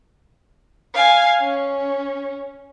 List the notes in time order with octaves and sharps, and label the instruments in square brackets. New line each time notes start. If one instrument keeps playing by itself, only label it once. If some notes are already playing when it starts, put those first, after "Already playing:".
[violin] F5 G#5
C#4